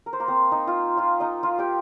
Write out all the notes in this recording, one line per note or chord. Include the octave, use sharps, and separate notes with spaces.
A#4
C5
A#3 A#4
C4 C5
D#4 D#5
F4 F5
F4 F5
D#4 D#5
F4 F5
G4 G5